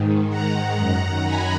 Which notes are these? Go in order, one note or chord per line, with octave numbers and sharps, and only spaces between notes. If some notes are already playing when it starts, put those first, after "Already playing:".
Already playing: G#2 D#3
F#5 A#5
F#2 D#3
G#5 B5